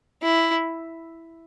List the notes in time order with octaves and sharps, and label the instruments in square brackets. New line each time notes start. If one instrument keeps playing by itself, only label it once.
[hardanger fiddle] E4